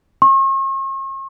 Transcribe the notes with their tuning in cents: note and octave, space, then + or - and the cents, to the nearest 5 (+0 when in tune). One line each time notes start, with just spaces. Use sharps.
C#6 -45